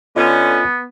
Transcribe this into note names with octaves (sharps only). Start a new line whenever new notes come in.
D3 B3 C#4 F4 D#5